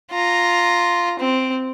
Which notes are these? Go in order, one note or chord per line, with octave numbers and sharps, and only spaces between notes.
F4 A#5
C4